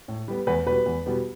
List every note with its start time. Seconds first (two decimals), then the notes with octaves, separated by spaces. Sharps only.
0.08 A2
0.28 G3 B3
0.47 E2 B4
0.66 B2 G3 B3 B4
0.86 E2
1.06 B2 G3 B3